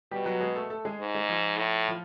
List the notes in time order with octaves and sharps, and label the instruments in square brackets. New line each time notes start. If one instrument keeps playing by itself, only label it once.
[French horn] B2 [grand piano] G3 G4
[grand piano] F#3 F#4
G#3 G#4
A3 A4
A3 A4
G#3 G#4
[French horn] G#2
[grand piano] G#3 G#4
F3 F4
[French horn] A2
[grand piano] F3 F4